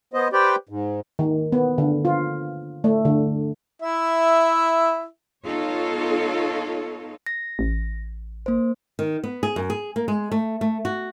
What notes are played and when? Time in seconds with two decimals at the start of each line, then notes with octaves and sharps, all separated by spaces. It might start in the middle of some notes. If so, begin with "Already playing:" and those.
0.14 B3 C5 D#5
0.33 G4 B4 C5 D5 G5
0.69 G#2
1.19 D#3
1.52 B3
1.78 D3
2.05 F4
2.84 A3
3.05 D3
3.82 E4 E5
5.46 B3 D#4 F4 A4 C#5
7.26 A#6
7.59 A1
8.46 A#3 C5
8.99 D#3
9.24 B3
9.43 G#4
9.56 F#2
9.70 G#4
9.96 A#3
10.08 G#3
10.32 A3
10.61 A3
10.85 F#4